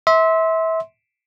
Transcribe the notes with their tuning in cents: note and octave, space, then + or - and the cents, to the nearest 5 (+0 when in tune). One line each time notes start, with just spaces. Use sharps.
E5 -25 C6 +0